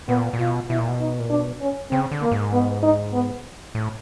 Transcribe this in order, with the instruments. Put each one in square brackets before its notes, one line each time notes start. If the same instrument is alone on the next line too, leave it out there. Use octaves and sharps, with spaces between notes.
[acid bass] A#2 [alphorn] B3
[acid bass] A#2
[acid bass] B2 [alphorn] F4
[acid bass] B2 [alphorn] E4
[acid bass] A#2
B2
[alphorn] D#4
[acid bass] A#2
[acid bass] B2 [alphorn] D4
[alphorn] C#4
[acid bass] C#3 [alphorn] C4
[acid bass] D3
[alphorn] A#3
[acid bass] G#2
[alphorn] B3
D#4
B3
[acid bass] A2